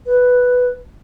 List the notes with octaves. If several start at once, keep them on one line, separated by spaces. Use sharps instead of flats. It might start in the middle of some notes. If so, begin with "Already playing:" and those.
B4